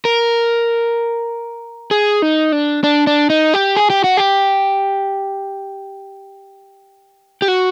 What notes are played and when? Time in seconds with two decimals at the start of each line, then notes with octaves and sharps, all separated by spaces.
0.05 A#4
1.91 G#4
2.22 D#4
2.52 D4
2.84 D4
3.07 D4
3.30 D#4
3.54 G4
3.77 G#4
3.90 G4
4.04 F#4
4.17 G4
7.42 G4
7.48 F#4